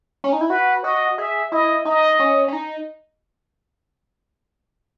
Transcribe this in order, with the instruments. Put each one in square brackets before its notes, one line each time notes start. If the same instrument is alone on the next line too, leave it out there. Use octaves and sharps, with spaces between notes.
[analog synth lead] C#4
D#4
E4
[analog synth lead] F#4 [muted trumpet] B4
[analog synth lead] F#4 [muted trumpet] D#5
[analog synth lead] G#4 [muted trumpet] E5
[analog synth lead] E4 [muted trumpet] D#5
[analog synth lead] D#4 [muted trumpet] D#5
[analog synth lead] C#4
C#4
D#4